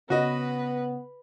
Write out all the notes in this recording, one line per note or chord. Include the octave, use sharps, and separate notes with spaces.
C#3 B3 F#4 B4 D#5